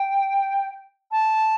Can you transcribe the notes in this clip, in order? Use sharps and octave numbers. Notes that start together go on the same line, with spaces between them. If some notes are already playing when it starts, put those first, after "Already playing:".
Already playing: G5
A5